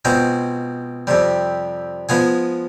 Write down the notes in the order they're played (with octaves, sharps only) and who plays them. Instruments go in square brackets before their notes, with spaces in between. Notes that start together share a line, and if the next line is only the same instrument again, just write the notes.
[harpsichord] B2 G#3 C4 F4 C5
F2 C3 G3
F3 G#3 B3 F4 G#4